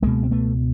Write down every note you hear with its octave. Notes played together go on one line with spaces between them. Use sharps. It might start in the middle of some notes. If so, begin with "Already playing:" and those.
C#2 B2 G#3 A#3
C4
A3 B3